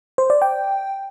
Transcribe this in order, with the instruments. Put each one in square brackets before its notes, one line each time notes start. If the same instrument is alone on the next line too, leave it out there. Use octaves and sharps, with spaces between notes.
[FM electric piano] C5
D5
G5